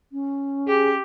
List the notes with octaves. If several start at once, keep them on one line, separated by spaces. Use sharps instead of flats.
C#4
G4 G#4